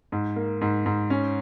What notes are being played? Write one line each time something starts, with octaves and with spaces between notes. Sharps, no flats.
G#2
A#3
G#2
G#2
C#4